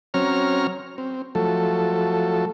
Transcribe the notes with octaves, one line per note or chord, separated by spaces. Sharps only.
F#3 C4 C#4 C#5 A#5 F6
C4
F3 F#3 A3 A4